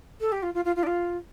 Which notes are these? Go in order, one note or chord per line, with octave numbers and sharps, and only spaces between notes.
A4
G4
F4
F4
F4
F4
D4
F4